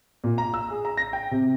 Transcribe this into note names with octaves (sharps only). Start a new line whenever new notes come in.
A#2
A#5
E6
G#4
A#5
A#6
G5
C3